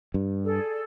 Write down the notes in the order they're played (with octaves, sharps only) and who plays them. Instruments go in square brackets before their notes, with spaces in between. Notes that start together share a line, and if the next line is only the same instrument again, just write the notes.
[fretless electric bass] G2
[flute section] G#4 A4 D5